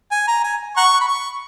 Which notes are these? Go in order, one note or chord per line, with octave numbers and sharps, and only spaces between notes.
G#5
A#5
G#5
F#5 A#5 C#6
B5
C#6